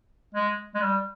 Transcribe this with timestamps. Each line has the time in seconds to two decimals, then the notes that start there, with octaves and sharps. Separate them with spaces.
0.34 G#3
0.75 G#3
0.82 G3